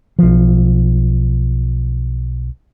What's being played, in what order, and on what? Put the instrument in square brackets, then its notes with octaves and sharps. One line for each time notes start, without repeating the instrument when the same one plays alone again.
[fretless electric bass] B1 F3